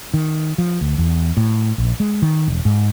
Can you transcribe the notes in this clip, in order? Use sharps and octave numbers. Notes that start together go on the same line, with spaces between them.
D#3
F3
D2
E2
A2
A#1
G#3
D#3
E1
G#2